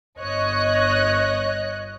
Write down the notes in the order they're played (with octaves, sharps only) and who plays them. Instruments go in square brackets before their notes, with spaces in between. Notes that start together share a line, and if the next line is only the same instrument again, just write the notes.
[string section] G1 C#5 D#5 F#6